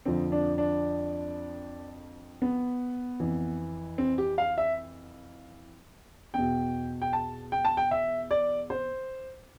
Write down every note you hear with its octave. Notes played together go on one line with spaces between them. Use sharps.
F2 D3 F3 C4
D4
D4
B3
F2 E3
C4
G4
F5
E5
E2 B2 G5
G5
A5
G5
A5
G5
E5
D5
C5